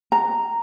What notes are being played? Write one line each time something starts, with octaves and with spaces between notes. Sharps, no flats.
A#5